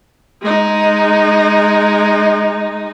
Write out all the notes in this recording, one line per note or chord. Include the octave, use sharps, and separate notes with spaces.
G#3 D#4